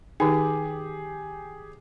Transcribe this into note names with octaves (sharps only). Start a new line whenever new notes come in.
D#3 D#4 G4 G#4